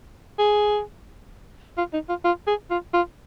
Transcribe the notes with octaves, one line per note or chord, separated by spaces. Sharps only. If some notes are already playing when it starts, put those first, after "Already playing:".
G#4
F4
D#4
F4
F4
G#4
F4
F4